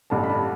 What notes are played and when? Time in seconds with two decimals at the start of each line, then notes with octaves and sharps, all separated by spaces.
0.10 A1 G2 D3 A5
0.24 B5
0.30 A5